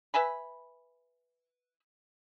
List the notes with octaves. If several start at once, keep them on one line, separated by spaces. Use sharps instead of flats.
B4 E5 G#5 B5